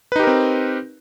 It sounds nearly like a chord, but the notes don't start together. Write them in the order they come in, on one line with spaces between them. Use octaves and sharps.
B4 D#4 G4 A#4 C4